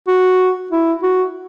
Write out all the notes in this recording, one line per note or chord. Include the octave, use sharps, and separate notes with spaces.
F#4
E4
F#4